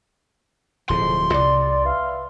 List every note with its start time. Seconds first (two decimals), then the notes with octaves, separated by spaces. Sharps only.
0.90 D1 F2 B2 F3 C6
1.33 C2 C3 D5
1.85 B4 E5 F5